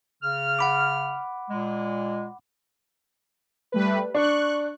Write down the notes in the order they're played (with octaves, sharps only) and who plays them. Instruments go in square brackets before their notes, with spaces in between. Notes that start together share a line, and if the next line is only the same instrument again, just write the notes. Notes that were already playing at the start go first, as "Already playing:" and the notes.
[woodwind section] C#3 F6
[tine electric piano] F#5 B5 D6
[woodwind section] A#2 G#3
[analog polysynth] G3 A3 B4
[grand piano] D4 [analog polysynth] C#6 F#6